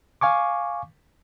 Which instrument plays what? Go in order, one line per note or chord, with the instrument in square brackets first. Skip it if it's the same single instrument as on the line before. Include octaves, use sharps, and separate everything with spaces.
[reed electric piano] F5 G#5 C#6 D6